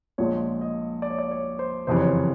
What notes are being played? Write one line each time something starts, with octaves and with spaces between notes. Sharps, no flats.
A#1 A#2 F3 G#3 C#5
D#5
D5
C#5
D5
C#5
C5
F#1 F2 C3 E3 C5
C#5
C5